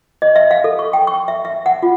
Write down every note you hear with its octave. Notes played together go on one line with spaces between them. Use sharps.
D#5
E5
F5
A4
C#6
G5
C#6
E5
E5
F#5
F4